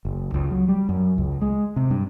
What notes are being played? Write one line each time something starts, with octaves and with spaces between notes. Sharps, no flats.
F#1
C#2
F#3
G3
F#2
C#2
G#3
C3
G2